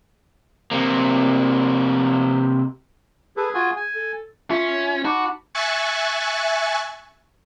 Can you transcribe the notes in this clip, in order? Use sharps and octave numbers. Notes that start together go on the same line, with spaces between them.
C3 A#3
G#4 A4 B4
F4 F#4 G#5
G#5
A4
C#4 F4 E5
D#4 F#4 A5 B5 D6
E5 G#5 C#6 F#6 A6 C#7